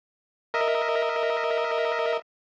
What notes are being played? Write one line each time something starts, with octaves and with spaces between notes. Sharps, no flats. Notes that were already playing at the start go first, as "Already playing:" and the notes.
A#4 D#5 E5